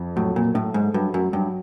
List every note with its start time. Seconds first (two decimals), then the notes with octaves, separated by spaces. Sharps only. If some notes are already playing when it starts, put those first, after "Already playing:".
Already playing: F2
0.16 A2 F#3
0.36 A#2
0.54 A2 A3
0.74 G#2
0.94 G2 F#3
1.14 F#2
1.33 G2 F#3